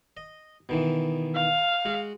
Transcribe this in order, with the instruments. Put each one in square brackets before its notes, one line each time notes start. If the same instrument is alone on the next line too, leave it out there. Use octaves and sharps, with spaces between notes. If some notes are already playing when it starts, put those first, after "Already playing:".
[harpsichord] D#5
B2 D#3 E3
[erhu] F5
[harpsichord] G#3 F#4